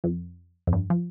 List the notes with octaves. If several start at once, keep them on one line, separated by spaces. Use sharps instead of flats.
F2
F2
G2
F3